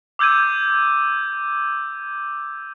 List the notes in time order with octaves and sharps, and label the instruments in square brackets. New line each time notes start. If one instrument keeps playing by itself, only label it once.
[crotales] D6 E6 G6 G#6 D#7